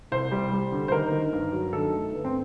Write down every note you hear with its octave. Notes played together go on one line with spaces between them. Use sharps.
C2 C5
G3
G3
D3
C5
D#3 A#4
D#3
G2
F#3
D#3 A4
A3
G1
C4